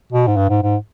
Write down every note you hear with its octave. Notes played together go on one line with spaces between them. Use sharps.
B2
G#2
G2
G#2
G#2